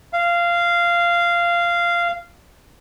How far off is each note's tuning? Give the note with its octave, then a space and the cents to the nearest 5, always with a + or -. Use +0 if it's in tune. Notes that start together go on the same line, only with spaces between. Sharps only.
F5 -15